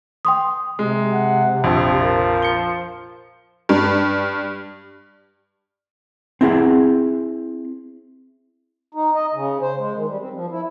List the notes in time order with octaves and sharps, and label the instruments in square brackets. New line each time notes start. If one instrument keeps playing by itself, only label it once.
[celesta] G5 C6 D#6
[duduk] C3 [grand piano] G#3
[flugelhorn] F#5
[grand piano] A#1 F2 [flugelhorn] F3
[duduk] A#4
[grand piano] C#7 G7
[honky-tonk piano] G2
[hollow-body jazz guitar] C4 E4 G#4 F#5
[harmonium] D#4
D#5
C#3
C5
G#3
D#3
G3
C4
F3
E4